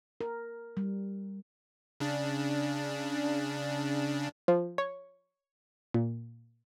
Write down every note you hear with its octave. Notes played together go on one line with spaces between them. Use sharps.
A#4
G3
C#3 D4
F3
C#5
A#2